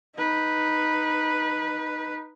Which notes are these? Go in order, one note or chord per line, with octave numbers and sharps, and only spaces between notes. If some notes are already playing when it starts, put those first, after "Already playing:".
D#4 B4